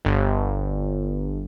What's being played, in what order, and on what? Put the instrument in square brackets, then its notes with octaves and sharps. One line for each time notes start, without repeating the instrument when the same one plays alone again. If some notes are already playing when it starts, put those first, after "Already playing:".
[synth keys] G1